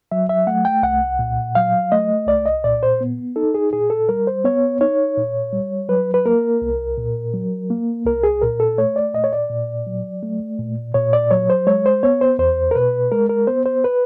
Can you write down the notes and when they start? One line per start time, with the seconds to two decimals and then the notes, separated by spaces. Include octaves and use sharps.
0.12 F#3 E5
0.29 E5
0.47 A3 F#5
0.65 G5
0.83 C2 F#5
1.19 A#2
1.55 F#3 F5
1.92 A3 D#5
2.27 C2 D5
2.46 D#5
2.64 A#2 D5
2.83 C5
3.01 B3
3.36 D#4 A4
3.54 G#4
3.73 A#2 G#4
3.90 A4
4.09 G3 A#4
4.27 C5
4.45 B3 C#5
4.81 D#4 C#5
5.17 A#2
5.53 G3
5.89 F#3 B4
6.14 B4
6.26 A#3 A#4
6.62 C2
6.98 A#2
7.34 F#3
7.70 A#3
8.06 C2 A#4
8.23 G#4
8.41 A#2 A#4
8.60 A4
8.78 A3 C#5
8.96 D5
9.14 A#2 D#5
9.24 C#5
9.33 D5
9.50 A#2
9.87 F#3
10.23 A3
10.59 A#2
10.94 A#2 C#5
11.13 D5
11.31 F#3 C#5
11.50 C5
11.67 G#3 C#5
11.86 C5
12.03 B3 C#5
12.21 C5
12.39 E2 C5
12.71 A#4
12.75 B2 B4
13.12 G#3 A#4
13.29 A#4
13.47 B3 C5
13.66 C5
13.84 B4